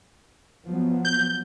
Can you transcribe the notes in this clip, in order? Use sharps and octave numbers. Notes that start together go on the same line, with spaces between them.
F3 F#3 B3
G6